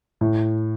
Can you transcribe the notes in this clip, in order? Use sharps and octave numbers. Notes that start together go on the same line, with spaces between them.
A2